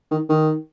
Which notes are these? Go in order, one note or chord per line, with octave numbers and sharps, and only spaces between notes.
D#3
D#3